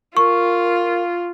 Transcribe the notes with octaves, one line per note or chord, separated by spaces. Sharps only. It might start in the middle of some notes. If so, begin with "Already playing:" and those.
F4 A#4 C#6